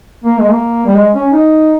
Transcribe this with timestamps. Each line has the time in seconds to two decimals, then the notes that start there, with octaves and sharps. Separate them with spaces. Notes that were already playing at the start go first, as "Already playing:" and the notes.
0.24 A#3
0.38 G#3
0.51 A#3
0.86 G3
0.96 G#3
1.14 C#4
1.32 D#4